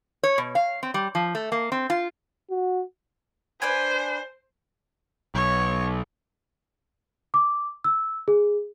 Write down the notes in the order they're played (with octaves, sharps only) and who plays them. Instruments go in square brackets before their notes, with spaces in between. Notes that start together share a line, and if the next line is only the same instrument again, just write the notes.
[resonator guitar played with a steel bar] C#5
B2
F5
C4
G3
F3
A3
A#3
C4
F4
[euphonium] F#4
[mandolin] D4 B4 G#5 [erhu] C5
[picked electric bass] B1 [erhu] C#5
[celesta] D6
E6
G#4